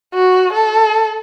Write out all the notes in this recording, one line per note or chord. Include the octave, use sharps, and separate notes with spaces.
F#4
A4